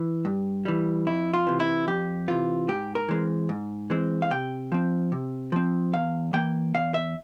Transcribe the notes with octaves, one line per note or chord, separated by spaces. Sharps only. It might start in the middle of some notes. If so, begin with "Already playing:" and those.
Already playing: E3
G2
E3 G3
F2 E4
F4
C3 E3
E4
F2 G4
C3 E3 F4
G#2 G4
A#4
E3 G#3 C4
G#2
E3 G#3 C4
F5
C3 G5
F3 C4
C3
F3 C4
E2 F5
E3 A#3 G5
E2 F5
E5